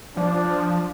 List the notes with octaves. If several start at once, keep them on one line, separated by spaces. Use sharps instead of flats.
F3 D4